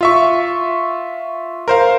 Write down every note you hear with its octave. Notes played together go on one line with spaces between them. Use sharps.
F4 E5 C#6
A#4 C5 F5